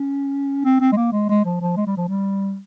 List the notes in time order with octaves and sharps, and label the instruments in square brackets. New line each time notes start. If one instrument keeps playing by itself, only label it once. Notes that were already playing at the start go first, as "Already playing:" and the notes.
Already playing: [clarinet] C#4
C4
C4
G#3
A#3
G#3
G#3
F3
F3
G#3
G3
F3
G3